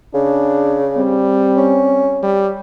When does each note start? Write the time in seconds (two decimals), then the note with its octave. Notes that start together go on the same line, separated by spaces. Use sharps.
0.14 C#3 D4
0.97 G3 C4
1.57 C#4
2.23 G3